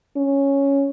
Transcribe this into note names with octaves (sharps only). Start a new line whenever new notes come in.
C#4